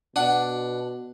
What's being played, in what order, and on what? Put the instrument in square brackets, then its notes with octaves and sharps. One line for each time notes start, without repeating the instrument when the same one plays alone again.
[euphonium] B2 [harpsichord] D4 F#5